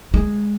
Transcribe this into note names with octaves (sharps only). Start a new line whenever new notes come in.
G#3